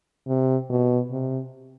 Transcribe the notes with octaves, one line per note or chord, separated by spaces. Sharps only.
C3
B2
C3